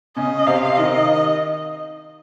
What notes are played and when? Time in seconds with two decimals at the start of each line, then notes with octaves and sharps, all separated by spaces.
0.16 C#3 C#4 D#5
0.47 C3 C4 F5
0.78 D#3 D#4 D#5